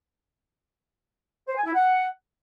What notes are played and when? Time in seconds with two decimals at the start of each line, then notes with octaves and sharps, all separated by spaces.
1.48 C5
1.56 G#5
1.65 E4
1.74 F#5